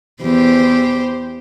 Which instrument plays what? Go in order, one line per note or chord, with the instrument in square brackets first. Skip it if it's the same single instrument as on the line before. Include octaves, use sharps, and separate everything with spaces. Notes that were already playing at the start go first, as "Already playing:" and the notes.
[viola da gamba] E2 G4 C5